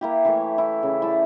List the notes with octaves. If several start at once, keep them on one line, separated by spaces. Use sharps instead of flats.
A#3 E4 G4
E3 A3 C#5
E4
C#3
E4 D5 A5